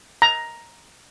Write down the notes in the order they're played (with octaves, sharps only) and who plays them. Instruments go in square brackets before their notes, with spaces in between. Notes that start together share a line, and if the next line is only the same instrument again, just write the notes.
[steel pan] A#5